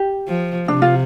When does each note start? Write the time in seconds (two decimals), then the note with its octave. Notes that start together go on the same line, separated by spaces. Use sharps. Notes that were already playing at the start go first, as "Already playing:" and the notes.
Already playing: G4
0.27 F3
0.68 C3 D4
0.82 F4